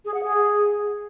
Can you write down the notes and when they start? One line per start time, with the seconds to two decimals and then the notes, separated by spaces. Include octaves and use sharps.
0.05 G#4
0.14 F#5
0.23 G#4